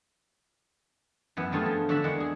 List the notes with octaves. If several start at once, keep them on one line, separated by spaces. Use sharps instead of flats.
F#2 E3 B3
G2 E3 A3 F4 G#4
F3
D3 F#4 D5 E5 B5
E2 G#3 A#3 F#5
G#4